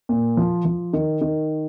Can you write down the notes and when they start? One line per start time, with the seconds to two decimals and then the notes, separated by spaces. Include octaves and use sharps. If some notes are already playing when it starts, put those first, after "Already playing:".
0.09 A#2
0.37 F3
0.65 F3
0.93 D#3
1.21 D#3